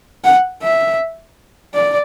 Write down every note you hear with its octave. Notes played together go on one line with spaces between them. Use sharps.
F#5
E5
D5